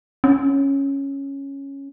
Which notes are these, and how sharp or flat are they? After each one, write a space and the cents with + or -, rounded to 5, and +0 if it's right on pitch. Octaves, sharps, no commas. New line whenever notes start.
C#4 -5